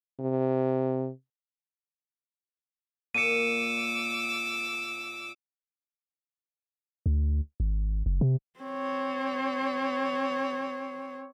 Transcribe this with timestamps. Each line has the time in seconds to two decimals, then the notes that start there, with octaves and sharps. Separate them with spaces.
0.20 C3
3.15 A#2 D6 E6 C#7 D#7
7.06 D2
7.60 G#1
8.06 F#1
8.21 C3
8.60 C4 C#5